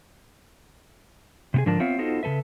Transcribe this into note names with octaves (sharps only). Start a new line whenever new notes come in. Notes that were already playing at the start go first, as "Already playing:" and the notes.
C3 B3 G#4
G#2 D3 F3 D4 A#4 A5
B3 C4 F4 C#5 E5 F5
B3 D#4 F4 F#4 A4 C5
C#3 G3 A4 B4 E5